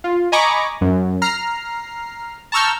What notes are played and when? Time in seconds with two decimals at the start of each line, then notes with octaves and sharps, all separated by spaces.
0.04 F4
0.32 D#5 G#5 A#5 B5 C#6 D6
0.81 F#2
1.22 A#5 F6 C7
2.52 A5 A#5 C#6 E6 F6 G6